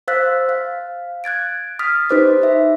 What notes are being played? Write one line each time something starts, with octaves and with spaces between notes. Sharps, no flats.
C5 F5 E6 F#6 A6 B6
F5
F#6 G#6 A6 D7
D#6 F6 A6 B6
D#4 G4 B4 C5 D6 B6
B4 E5